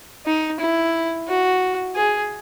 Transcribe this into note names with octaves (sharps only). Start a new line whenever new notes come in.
D#4
E4
F#4
G#4